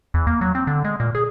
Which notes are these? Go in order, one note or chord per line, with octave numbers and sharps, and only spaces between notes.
E2
A#3
F#3
C4
D3
G#3
A#2
G#4